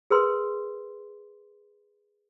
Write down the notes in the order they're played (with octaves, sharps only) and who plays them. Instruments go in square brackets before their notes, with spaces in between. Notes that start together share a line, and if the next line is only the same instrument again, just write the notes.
[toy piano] G#4 A#4 B4 C6